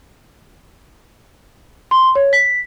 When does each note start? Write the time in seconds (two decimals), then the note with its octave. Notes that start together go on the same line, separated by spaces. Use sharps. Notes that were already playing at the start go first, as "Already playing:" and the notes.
1.91 C6
2.15 C#5
2.33 B6